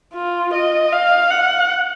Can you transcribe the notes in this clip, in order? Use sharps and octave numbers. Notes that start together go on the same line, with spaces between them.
F4
D#5
F5
F#5